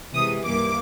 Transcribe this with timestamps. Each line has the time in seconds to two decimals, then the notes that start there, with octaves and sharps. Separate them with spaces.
0.14 C3 E3 G#3 D#6
0.44 G2 E3 G3 A#3 D6